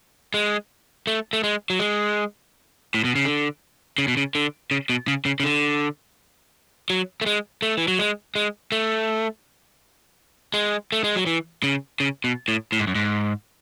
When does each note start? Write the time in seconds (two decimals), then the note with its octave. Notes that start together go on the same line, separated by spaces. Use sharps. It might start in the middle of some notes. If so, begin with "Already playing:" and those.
0.34 G#3
1.07 A3
1.33 A3
1.44 G#3
1.70 F#3
1.80 G#3
2.94 A2
3.05 B2
3.15 C#3
3.25 D3
3.98 C#3
4.08 B2
4.17 C#3
4.35 D3
4.71 C#3
4.90 B2
5.08 C#3
5.25 C#3
5.40 C#3
5.44 D3
6.90 F#3
7.21 A3
7.26 G#3
7.62 A3
7.77 E3
7.88 F#3
7.99 G#3
8.35 G#3
8.72 A3
10.54 G#3
10.92 A3
11.04 G#3
11.15 F#3
11.26 E3
11.64 C#3
12.00 C#3
12.24 B2
12.48 A2
12.72 A2
12.80 G#2
12.87 F#2
12.95 G#2